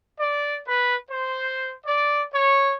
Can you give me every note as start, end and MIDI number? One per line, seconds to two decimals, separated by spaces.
0.20 0.59 74
0.68 0.96 71
1.11 1.73 72
1.86 2.23 74
2.34 2.75 73